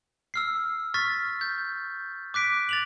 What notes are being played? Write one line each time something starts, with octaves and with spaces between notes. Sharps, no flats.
E6 F6 C7
C#6 F6 A6 B6
G6
D6 F#6 B6 D7
A6 F7 F#7